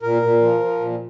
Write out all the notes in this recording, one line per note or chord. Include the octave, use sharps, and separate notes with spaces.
A#2 A#4
A#2
F3
F3
A#2